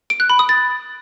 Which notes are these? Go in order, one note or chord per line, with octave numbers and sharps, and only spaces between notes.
D7
F#6
B5
D#6
A6